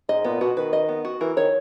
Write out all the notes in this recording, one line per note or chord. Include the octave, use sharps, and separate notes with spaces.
G#2 D#5
A#2 B3
B2 F#4
D#3 B4
D#5
B3
F#4
E3 A#4
D#3 C#5